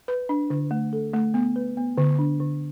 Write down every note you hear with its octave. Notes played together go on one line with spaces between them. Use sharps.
B4
D4
D3
A3
A4
A3
B3
B4
B3
D3
D4
D3